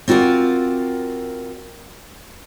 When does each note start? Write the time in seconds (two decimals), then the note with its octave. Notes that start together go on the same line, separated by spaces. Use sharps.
0.08 C4 F4 F#4 A#4 D5